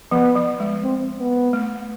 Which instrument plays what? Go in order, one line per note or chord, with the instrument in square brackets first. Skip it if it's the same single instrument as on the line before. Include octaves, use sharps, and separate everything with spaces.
[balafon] F3 [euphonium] B3
[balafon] F3
G#3
[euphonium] C4
B3
[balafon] A3